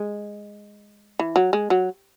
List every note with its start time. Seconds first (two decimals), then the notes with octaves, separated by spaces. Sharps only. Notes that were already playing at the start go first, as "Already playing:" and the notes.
Already playing: G#3
1.19 E3
1.36 F#3
1.53 G#3
1.70 F#3